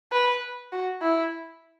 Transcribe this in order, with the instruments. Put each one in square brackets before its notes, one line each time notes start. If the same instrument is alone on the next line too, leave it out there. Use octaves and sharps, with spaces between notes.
[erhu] B4
F#4
E4